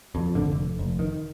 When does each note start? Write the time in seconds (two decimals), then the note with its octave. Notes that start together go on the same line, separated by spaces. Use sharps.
0.15 F2
0.34 G#1 D3
0.51 F1
0.79 F1
0.99 D#3